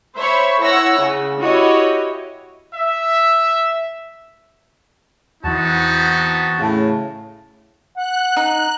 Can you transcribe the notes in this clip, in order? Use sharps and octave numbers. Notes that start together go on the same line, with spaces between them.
C5 C#5 E5 B5 C#6
E4 C#5 F#5 E6 A#6
C#3
E4 F#4 G4 C#5 D#5
E5
E2 E3 B3 C4 D#4 F#4 A5
A2 C#3
F#5 F#6
D#4